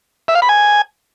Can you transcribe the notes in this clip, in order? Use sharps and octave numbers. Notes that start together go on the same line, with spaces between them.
E5
F5
B5
G#5